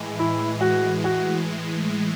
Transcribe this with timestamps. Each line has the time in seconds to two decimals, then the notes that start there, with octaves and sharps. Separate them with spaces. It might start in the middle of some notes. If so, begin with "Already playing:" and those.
Already playing: A2 E3 G#3
0.19 E4
0.61 F#4
1.04 F#4